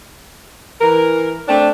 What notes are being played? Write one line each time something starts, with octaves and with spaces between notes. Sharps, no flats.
E3 A#4
A3 C4 D4